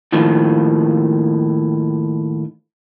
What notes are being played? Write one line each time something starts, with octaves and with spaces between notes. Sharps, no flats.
D#2 A2 D#3 F3